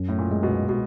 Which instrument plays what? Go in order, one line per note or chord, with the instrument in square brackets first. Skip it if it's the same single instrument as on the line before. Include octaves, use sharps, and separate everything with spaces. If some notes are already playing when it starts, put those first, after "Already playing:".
Already playing: [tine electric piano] F#2
[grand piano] A2
A#2
[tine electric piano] G#3
[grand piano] B2
B2